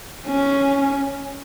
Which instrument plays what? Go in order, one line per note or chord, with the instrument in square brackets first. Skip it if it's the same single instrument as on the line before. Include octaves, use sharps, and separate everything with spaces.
[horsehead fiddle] C#4